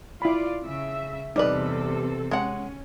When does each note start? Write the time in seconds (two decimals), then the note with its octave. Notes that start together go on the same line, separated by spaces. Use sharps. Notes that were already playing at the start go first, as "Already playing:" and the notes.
0.22 E4 F4 D5 B5
0.63 C#3 E5
1.36 E2 C3 G3 D#4 A4 B4 D5 D#5
2.31 G#3 C#4 F#5